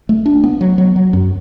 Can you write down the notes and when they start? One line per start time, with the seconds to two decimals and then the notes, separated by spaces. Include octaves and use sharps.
0.09 A3
0.26 D4
0.44 B3
0.61 F#3
0.78 F#3
0.96 F#3
1.13 F#2